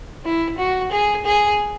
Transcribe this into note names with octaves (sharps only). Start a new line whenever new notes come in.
E4
F#4
G#4
G#4